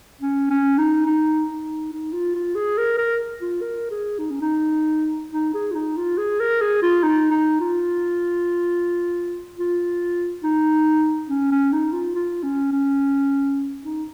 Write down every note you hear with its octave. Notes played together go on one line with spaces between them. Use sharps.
C#4
C#4
D#4
D#4
D#4
D#4
F4
F4
G#4
A#4
A#4
F4
A#4
G#4
D#4
C#4
D#4
D#4
G#4
F4
D#4
F4
G#4
A#4
G#4
F4
D#4
D#4
F4
F4
D#4
C#4
C#4
D#4
F4
F4
C#4
C#4
D#4